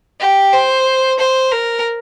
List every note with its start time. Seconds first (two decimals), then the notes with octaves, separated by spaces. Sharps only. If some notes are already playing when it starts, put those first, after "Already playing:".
0.20 G4
0.53 C5
1.19 C5
1.52 A#4